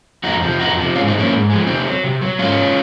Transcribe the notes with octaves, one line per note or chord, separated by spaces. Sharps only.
F2 D#4 F#4
C3 F3
F2 D#4 F#4
C3 F3
G#2 C#4 F4
C4 D#4
G#3
F3 A#3 C#4
G#2
F3 G#3
C3 C4 D#4
F#3
C3
F#3
G#2 C#4 F4
F#3